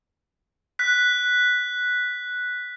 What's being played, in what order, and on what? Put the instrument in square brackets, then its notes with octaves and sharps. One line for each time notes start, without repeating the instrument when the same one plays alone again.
[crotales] F#6 B6